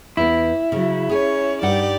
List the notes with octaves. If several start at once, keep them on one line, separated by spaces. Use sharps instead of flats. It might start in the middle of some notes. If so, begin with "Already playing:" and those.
E2 B3 E4
C#3 F#3
C#4 G#4 C#5 G#5
G2 D#4 G4 D5 F#5